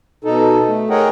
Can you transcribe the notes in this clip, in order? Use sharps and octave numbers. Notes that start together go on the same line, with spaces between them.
B2 D#4 A4
A3
G#4 A#4 C#5 D#5 F#5 G5